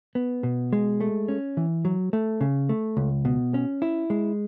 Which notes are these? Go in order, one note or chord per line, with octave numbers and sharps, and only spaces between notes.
B3
B2
G#3
A3
C#4
E3
F#3
A3
C#3
A3
C#2
B2
C#4
E4
G#3